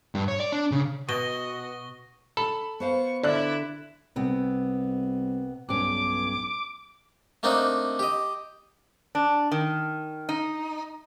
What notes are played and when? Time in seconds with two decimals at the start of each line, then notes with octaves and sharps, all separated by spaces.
0.15 G2
0.28 C#5
0.40 D5
0.52 D4
0.71 C#3
1.09 B2 F#4 D#5 C#6 A#6 G7
2.37 A4 B5
2.80 B3 C5 F5 C#6
3.23 D3 E4 D5 F#6
4.16 C2 C3 B3
5.69 B1 G2 C#4 D6
7.43 A3 A#3 C4 D4 D#4
7.99 G4 D#5
9.15 D4
9.52 D#3
10.29 D#4